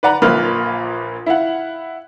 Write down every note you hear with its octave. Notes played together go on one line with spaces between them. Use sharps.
B4 D5 F#5 A#5
A#1 A#2 A#3 B4 B5 F6
E4 F5 F#5